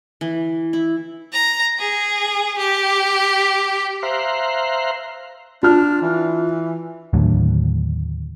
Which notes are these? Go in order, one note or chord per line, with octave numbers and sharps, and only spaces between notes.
E3
E4
A#5
G#4
G4
C5 E5 F5 A#5 C6 F#6
D4 F4 F6
E3
D#2 A2 D3 F#3